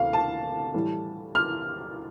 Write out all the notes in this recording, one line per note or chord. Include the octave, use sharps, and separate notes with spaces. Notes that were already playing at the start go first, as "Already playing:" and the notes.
Already playing: D2 C3 F5
A5
A2 E3 G3
F6